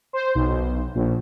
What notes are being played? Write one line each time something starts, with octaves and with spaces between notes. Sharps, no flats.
C5
B1
A#1